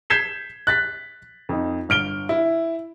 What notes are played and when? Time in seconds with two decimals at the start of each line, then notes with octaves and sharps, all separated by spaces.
0.10 G6 G#6 B6 C7 E7 G7
0.67 F#6 A6 B6
1.49 F2 D#4
1.89 G1 F6 D7 G7
2.29 E4